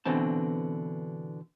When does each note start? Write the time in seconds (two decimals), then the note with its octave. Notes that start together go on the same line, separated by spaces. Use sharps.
0.05 B2 D3 E3 C4 A5